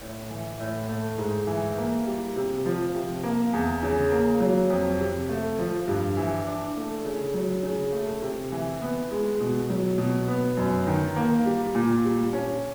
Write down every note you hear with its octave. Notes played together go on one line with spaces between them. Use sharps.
A2
E3
A2
A3
G#2
E3
A#3
G3
C3
F3
C3
A#3
E2
C#3
A#3
F#3
F2
C3
A3
F3
G2
E3
D4
A3
C#3
F#3
C#3
A3
C3
E3
B3
G#3
B2
F#3
B2
B3
F#2
D#3
A#3
G3
A#2
G3
C#4